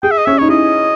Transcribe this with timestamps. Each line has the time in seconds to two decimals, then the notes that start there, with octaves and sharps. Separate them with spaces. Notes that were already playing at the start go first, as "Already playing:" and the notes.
0.03 G#4 G5
0.11 E5
0.18 D#5
0.25 C#4 E5
0.38 D#4 C#5
0.49 E4 D#5